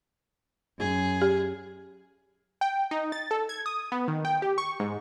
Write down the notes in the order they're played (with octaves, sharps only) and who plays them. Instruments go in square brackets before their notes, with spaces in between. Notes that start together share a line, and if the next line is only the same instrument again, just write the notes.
[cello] F#2 G#4
[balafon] G4
[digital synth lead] G5
D#4
A6
A4
G#6
D#6
B3
D#3
G5
G4
C#6
G#2